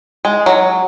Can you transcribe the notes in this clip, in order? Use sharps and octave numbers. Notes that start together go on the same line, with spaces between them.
G#3
F#3